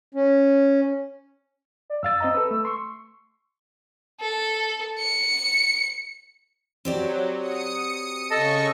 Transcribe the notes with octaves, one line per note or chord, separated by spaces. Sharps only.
C#4
D5
F#2 F5 E6 A6
C4 D#5 A#5
A4 B4
A3
C6 C#6
A4
C#7
F#3 C4 G4 D5
D#6 C#7
C#3 A4 D#5 A5 C#6